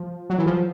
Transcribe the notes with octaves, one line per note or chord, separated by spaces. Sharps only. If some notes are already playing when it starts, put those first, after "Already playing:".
Already playing: F3
F#3
E3
F3